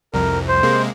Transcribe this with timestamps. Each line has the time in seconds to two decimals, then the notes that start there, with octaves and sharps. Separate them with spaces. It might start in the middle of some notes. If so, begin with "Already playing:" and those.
0.14 C2 F2 A#4
0.49 C5
0.63 C3 G#3 A#3